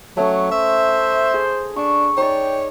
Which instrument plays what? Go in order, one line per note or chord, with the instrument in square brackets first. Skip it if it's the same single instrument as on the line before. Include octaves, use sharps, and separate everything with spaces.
[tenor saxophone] F#3 [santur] A3 C#4 D#6
[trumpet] C5 [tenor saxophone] E5
[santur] G#4
[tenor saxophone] D4 [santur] C#6
[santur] D#4 D5 [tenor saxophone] C#5 [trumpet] G5